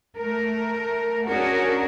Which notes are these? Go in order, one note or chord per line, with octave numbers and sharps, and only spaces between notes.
A3 A#4
C#4 D4 F#4 G#4 A#4